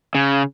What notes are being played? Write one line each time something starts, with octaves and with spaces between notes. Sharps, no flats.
C#3